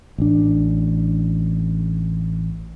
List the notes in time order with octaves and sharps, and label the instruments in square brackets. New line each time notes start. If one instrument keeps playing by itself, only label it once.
[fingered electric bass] A1 D4